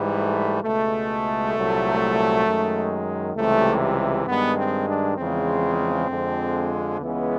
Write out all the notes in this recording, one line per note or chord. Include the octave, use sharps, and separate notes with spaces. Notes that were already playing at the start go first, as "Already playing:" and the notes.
Already playing: G#2 E3 G3
A3
C#2 B2 G#3 A3
C2 A#2 F#3
F#2 D#3 G#3
C#2 C3 E3 G3 A3
G2 D#3 G#3 B3
C4
D4
E2 C#3 F3 G#3 C4
F2 D3 F3 G#3
C#2 C#3 E3 G#3 B3